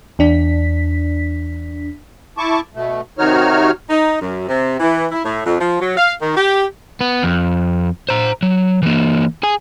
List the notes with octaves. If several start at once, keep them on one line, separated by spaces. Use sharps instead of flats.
E2 D4 B6
E4 A5 C#6 D6
B2 A3
C3 D#3 D#4 F#4 C#5 F6
D#4
F#2
C3
E3
E4
A2
F2
F3
F#3
F5
D#3
G4
B3
F2
C5 A#5
F#3
E3 A#3
G#4 G#5